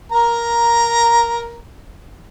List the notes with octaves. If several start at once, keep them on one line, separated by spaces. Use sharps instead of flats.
A#4 A#5